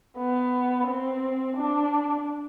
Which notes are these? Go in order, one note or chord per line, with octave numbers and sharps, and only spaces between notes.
B3
C4
D4